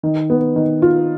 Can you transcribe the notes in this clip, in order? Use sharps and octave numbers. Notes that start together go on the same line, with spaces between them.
D#3
B3
D#3
F4